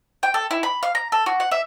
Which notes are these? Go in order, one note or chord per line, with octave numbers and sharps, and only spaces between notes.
G5
A4
E4
B5
F5
A#5
A4
F#4
F#5
E5